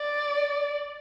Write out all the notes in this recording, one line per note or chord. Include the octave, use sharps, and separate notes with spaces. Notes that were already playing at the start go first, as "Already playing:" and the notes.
Already playing: D5